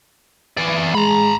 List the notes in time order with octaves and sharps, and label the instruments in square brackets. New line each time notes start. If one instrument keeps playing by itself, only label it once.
[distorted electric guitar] E3 D5
[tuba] G#3 [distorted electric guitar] A#5 B5